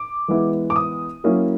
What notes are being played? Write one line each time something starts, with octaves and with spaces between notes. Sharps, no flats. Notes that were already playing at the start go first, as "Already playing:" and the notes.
Already playing: D6
E3 G#3 B3 E4
D6
D#6
F#3 A#3 C#4 E4